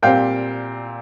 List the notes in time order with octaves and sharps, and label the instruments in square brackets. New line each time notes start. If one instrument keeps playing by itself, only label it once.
[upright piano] A#2 G3 C4 F5 G5